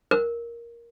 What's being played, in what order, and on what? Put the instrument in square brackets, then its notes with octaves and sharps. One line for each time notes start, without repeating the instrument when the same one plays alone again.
[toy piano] A#4